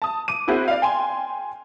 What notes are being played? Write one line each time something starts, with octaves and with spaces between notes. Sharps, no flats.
A5 D#6
D6 D#7
A#3 C4 E4 F#4 G#4 C5
D5 F5
G5 G#5 C6